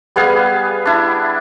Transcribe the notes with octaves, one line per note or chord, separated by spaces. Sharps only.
G3 B3 G#4 F5
D4 E4